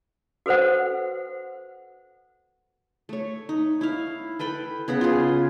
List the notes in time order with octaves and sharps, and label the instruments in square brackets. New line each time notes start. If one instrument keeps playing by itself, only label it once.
[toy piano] F#4 A4 B4 C5 F#5
[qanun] A3 C#5
D#4
E4 F5
A4 B4 G5 B5
C#3 B3 B4 F#5
F4 G#4